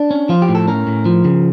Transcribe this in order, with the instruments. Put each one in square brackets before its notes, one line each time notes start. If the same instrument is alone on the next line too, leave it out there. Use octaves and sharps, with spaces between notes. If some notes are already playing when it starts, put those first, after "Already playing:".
Already playing: [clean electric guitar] D4
C#4
F3 F4
G4
A2
A4
C#4 A#4
A2
F3
C#3